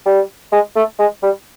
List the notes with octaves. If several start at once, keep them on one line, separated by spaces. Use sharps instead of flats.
G3
G#3
A3
G#3
G3